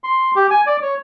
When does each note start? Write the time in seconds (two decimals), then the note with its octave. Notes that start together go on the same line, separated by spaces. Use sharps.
0.04 C6
0.36 G4
0.50 G#5
0.66 D5
0.82 C#5